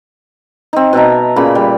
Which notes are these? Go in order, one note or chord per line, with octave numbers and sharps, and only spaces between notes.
C4 D#4
B2 E5 A5 A#5
A#2 C#3 B5
G3